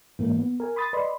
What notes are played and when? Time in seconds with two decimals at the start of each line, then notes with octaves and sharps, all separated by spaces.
0.19 G#2 E3 A#3
0.38 B3
0.60 A#4 G#5
0.76 B5 C6 D#6 A6
0.93 B4 D5 D#5 B5 C6